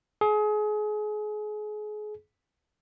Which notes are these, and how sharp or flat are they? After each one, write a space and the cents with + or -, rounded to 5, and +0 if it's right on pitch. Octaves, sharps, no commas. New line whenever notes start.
G#4 +30